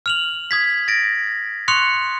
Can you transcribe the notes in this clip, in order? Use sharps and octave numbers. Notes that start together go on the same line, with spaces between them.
F6 F7 F#7
D#6 G#6 B6
A6 A#6 D7
C6 C#6 D#6 F#6 C#7 F7